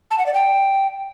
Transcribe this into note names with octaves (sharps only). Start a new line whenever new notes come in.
A5
F#5
D5
G5